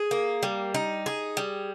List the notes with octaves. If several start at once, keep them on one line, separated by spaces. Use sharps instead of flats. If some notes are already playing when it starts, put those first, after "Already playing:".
Already playing: G#4
A#3
G3
D#4
G#4
G3